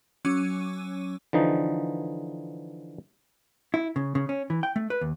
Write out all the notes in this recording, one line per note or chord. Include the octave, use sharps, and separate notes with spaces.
F#3 C#4 C#6 D6 E6 D#7
D3 E3 F3 D#4
E4
C#3
C#3
C#4
E3
G5
A3
B4
D#2